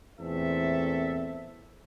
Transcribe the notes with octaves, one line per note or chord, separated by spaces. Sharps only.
E2 A#2 A3 C4 A4 E5